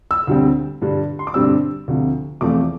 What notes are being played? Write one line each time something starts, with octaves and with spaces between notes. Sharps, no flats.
E6
D2 D3 G3 C4
G2 D3 G3
C6
D6
G2 D3 G3 C4 E6
D2 C3 F3
E2 C3 F3 A3 C4 D6